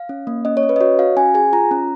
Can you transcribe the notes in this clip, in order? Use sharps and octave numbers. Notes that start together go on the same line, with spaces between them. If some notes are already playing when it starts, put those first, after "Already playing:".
Already playing: F5
C#4
A#3
C#4 D#5
C#5
C#4
B4
D#5
F#4 C#5
F#4 F5
C#4 G#5
G#4 G#5
F4 A#5
C#4